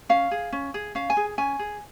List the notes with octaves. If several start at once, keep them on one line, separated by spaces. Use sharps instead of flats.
C#4 F5
G#4
C#4
G#4
C#4 F5
G#5
G#4
C#4 G#5
G#4